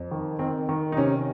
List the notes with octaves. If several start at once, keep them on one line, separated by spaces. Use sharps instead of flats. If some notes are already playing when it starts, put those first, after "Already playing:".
Already playing: F2
D#3
D#3 C4
D#3
D#4
C3 C#4